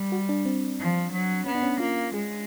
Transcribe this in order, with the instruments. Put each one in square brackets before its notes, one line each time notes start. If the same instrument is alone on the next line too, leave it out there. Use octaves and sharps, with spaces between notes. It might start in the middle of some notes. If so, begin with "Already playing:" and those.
Already playing: [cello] G3
[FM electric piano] F#4
D4
C4
[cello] F3
F#3
[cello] B3 [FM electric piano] C#4
[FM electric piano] D4
C#4
[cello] A#3 [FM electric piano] F4
[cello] G#3 [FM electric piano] G#4